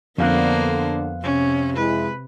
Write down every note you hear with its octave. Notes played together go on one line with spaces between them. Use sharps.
F2 D3 A#3 B3 C5 F5 F#6
C3 C#4
G#3 E4 B4